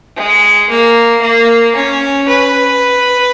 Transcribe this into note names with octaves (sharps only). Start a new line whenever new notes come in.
G#3
A#3
A#3
C#4
B4